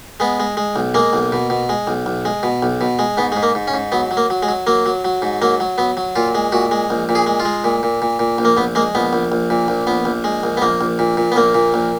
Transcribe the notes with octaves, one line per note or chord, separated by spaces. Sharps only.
G#3 B3
G#3
G#3
B1
G#3 A#3
B1
B2
B2
G#3
B1
B1
G#3
B2
B1
B2
G#3
G#2 B3
G#2 G#3
A#3
G#2
C#4
G#2
F#3 B3
F#3
A#3
F#3
G#3
F#3
F#3 A#3
F#3
F#3
G#2
F#3 A#3
F#3
F#3 B3
F#3
A#2 F4
G#3
A#2 F#4
G#3
A#1
A#2
G#4
G#3
F4
G#3
A#2
A#2
A#2
A#2
A#1
A#3
A#1 B3
G#3 A#3
A#1 B3
A#1
A#1
A#2
A#1
A#1 B3
A#1
G#3
A#1
B3
A#1 A#3
A#1
A#2
A#2
B3
A#1 A#3
A#2
A#1